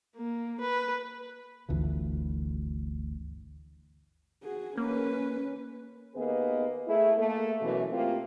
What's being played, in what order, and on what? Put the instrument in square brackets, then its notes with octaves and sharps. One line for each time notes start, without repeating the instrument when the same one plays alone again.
[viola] A#3
B4
[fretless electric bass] G1 D2 E3 F3
[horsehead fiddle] F#4 G#4
[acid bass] A#3 [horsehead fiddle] C#4 B4
[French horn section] D#2 A#3 B3 G#4 B4 D#5
A3 E4 G#4
A3 A#3 A4
F#2 B2 E3
A3 A#3 C4 F4 G4